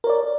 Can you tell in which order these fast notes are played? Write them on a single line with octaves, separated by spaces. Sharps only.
A#4 C#5 D5